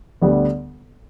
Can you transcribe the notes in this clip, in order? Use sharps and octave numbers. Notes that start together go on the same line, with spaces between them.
D2 D3 G3 B3